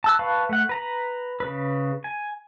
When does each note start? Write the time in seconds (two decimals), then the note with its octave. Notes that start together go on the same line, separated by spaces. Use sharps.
0.04 A5 E6 F#6
0.19 B4 F5 A5 B5 C#6
0.49 A3 F#5
0.69 B4 A#5 B5
1.40 C#3 B4
2.04 G#5